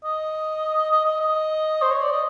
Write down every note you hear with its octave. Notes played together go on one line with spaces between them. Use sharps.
D#5
D#5
D#5
D#5
C5
C#5
D5
D#5